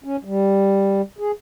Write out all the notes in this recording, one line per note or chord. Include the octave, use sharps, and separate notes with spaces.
C#4
G3
G#4